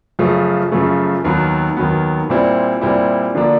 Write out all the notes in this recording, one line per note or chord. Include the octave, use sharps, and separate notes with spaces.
F#2 C#3 F3 A3
F#2 C#3 F3 A3
D#2 D#3 F#3 B3
D#2 D#3 F#3 B3
A#2 G3 C4 E4
A#2 G3 C4 E4
D3 F3 A#3 D4